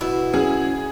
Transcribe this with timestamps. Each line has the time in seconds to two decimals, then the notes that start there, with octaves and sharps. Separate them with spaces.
0.01 B2 E4
0.34 C#4 G#4